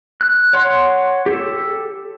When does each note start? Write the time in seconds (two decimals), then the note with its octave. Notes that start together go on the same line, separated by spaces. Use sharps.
0.21 F#6
0.53 C#5 F#5 C6
1.26 G4 A4